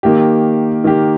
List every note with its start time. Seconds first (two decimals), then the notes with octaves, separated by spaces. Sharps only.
0.03 D#3 A#3 G4
0.84 D#3 A#3 G4